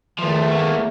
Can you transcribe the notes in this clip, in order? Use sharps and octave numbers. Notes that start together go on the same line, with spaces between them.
E2 D#3 F3 A3
A3 A#3